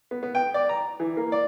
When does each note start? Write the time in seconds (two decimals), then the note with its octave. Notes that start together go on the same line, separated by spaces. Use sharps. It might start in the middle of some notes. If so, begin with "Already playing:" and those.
0.11 B3
0.23 B3
0.35 G5
0.54 D5
0.69 A#5
1.00 E3
1.17 A#3
1.32 D5